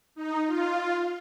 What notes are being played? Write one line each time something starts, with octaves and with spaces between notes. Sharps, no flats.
D#4
F4